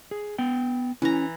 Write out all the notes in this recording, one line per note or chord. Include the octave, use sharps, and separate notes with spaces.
G#4
B3 G5
E3 C#4 A#5